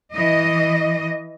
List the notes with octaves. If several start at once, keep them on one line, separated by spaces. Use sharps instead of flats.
E3 D#5